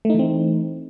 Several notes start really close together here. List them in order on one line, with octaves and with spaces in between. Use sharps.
A3 D#4 E3 C4